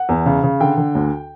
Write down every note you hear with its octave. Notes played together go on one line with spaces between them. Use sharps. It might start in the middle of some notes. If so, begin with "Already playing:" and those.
Already playing: F#5
E2
C#3
C#3
D3 G5
D3
D2